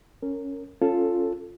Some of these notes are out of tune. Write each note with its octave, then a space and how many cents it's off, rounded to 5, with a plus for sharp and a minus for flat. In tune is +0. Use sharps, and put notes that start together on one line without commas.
C#4 +0 A#4 -20
C#4 -10 F4 +0 A4 +0